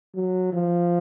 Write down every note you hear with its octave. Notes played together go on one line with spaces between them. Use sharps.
F#3
F3